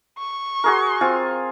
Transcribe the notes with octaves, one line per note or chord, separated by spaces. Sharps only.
C#6
F#4 G#4 A#4
C4 F4 G#5